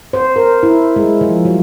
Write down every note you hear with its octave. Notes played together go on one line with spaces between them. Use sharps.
C5
A#4
E4
G#3
F3
F#3